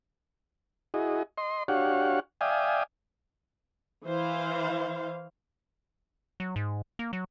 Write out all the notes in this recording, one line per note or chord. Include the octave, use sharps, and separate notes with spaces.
E4 F#4 G#4 D#5
D#5 C6
D4 F#4 G4 C#5 F5 F#5
D5 E5 F5 G5 G#5 D#6
E3 C5 F5
F#3
G#2
A#3
F#3